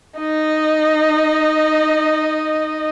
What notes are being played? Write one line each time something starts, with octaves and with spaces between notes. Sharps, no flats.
D#4 D#5